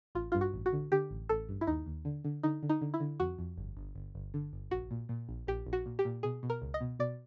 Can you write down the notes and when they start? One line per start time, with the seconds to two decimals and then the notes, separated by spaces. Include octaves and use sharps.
0.15 A1 F4
0.32 G2 F4
0.41 F#4
0.54 A1
0.66 F#4
0.73 D3
0.92 D3 G4
1.11 A1
1.29 A1 A4
1.49 G2
1.61 E4
1.67 D#2 D#4
1.86 D#2
2.05 D3
2.24 D3
2.43 D3 D#4
2.63 D3
2.69 D#4
2.81 D3
2.94 E4
3.00 D3
3.20 F2 F#4
3.38 F2
3.58 G1
3.77 G1
3.95 G1
4.15 G1
4.34 D3
4.53 G1
4.71 A#1 F#4
4.91 A#2
5.09 A#2
5.29 A#1
5.47 A#1 G4
5.66 A#1
5.73 F#4
5.86 A#2
5.99 G4
6.05 A#2
6.23 B2 G#4
6.43 B2
6.50 A#4
6.62 C#2
6.74 D#5
6.81 B2
6.99 B2 D5